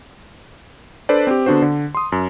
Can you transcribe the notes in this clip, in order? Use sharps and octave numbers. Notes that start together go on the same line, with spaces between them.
D4 A4 B4 C5 D5
C4 G4
D3 B3 D4 F#4 C5
D3
C6 D#6
F#2